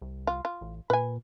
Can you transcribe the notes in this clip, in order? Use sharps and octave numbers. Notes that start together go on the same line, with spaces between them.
C2
F4
F4
A1
A#2 B4 G#5